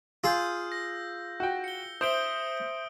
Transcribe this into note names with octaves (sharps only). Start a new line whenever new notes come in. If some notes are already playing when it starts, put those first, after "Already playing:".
F4 G#4 E6 G6
A#6
F#4 G5
C#7 G7
C5 E5 D#6 D7 G7